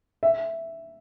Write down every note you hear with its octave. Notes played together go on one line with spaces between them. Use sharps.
E5